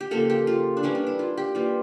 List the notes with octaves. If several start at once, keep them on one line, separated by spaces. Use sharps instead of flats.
G4
C#3 F3 A#3 A4
G4
F4
D4
E3 G3 A#3 C#4
D4
E4
F4
G4
E3 G3 A#3 F4